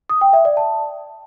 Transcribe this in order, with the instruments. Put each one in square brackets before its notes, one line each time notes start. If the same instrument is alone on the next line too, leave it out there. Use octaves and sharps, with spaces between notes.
[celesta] D#6
G5
E5
D5
A5